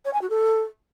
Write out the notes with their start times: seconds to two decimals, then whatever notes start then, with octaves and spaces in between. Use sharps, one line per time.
0.05 C#5
0.13 G#5
0.22 F#4
0.30 A4